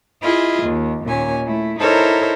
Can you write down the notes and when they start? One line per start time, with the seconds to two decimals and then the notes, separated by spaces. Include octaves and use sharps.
0.21 E4 F4 G#4 D#5
0.62 D#2
1.05 D#2 A#2 C#4 G#5
1.46 A3 E4
1.79 D#4 E4 A4 A#4 C5 C#5